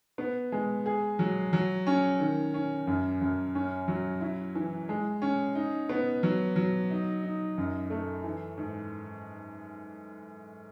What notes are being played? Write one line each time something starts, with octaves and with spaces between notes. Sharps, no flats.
B3
G#3
G#4
F#3
F#3
C#4
D#3
C#4
F#2
F#2
C#4
F#3
E4
E3
G#3
C#4
D#4
B3
F#3
F#3
D#4
D#4
F#2
A3
E3
G#2